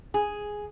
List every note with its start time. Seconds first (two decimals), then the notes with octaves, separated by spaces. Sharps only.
0.14 G#4